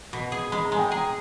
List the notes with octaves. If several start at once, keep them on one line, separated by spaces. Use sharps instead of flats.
B2
G#4
G#3 B5
A#5
G#3 G#5
G5
G#4 A#5